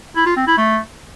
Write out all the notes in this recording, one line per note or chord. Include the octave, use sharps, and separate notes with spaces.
E4
F4
C4
E4
A3